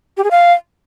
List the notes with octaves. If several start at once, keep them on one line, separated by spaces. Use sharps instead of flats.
G4
G#4
F5